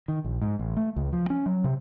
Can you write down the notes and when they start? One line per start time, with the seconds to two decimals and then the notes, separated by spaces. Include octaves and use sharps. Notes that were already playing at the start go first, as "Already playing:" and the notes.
0.08 D#3
0.24 A#1
0.42 G#2
0.59 A1
0.77 A3
0.96 C#2
1.13 F3
1.30 C#4
1.46 F#3
1.64 C3